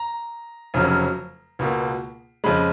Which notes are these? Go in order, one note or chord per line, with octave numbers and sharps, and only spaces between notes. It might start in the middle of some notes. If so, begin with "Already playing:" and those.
Already playing: A#5
F1 F2 C#3 F#3
C#2 B2 A#3
F2 C#3 G#3 B5